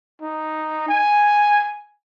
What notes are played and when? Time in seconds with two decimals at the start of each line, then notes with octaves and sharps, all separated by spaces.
0.22 D#4
0.88 G#5